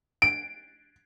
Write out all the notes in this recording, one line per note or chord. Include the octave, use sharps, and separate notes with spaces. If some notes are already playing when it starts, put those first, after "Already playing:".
D7